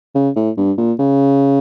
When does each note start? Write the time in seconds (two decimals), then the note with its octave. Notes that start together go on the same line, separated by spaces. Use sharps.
0.15 C#3
0.36 A2
0.57 G2
0.78 A#2
0.99 C#3